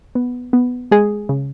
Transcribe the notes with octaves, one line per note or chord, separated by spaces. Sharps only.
B3
B3
G#3 G#4
C#3